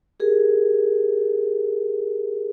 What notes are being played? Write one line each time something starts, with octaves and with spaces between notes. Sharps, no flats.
G4 G#4 A#4